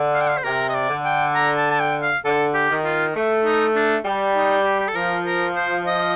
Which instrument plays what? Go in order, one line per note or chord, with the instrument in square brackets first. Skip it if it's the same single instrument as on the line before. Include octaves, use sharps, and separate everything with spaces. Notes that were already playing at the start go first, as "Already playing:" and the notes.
Already playing: [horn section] D3
[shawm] F5
G5
F5
C5
[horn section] C3 [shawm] A#4
[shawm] D#5
D5
[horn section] D3
[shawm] G5
A#5
A5
A5
G5
F5
[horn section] D3 [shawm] A4
[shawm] G4
[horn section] D#3
[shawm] F4
[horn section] A3
[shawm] D#4
D4
[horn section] G3
[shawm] D#4
G4
G4
A4
[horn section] F3 [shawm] A#4
[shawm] A#4
C5
D#5